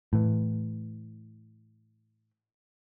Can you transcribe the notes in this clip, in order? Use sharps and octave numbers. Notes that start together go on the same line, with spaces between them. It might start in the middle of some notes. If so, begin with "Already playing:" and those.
A2 E3